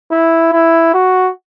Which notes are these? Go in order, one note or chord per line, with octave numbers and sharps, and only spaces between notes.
E4
E4
F#4